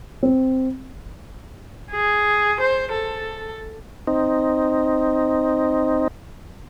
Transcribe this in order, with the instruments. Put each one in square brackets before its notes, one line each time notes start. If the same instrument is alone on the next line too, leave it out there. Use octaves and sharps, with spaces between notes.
[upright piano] C4
[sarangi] G#4
C5
A4
[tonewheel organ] C4 D#4